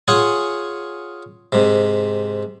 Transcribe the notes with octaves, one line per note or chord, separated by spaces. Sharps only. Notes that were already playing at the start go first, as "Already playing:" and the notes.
F4 G#4 C#5 F#5 G#5
G#2 C3